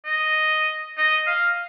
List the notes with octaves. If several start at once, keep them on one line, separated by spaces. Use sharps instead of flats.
D#5
D#5
F5